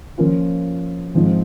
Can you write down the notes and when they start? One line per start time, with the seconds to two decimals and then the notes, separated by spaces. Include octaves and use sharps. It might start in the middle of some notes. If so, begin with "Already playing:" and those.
0.18 F3 A#3 C#4 F4
1.14 G#2 F3 C4